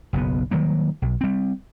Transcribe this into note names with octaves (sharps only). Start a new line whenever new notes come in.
F#1 B1 B3
D#3 F#3 G3 A#3
B1
G3 C4